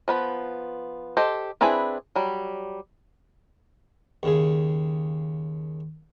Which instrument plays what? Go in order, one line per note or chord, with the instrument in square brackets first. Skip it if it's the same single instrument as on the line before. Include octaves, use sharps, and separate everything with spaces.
[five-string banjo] F3 B3 B4
G4 A4 C5 D#5
C4 D4 E4 G#4 B4
F#3 G3
[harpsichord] D#2 C#3 G#4